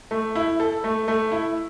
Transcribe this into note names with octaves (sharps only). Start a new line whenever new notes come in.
A3
E4
A4
A3
A3
E4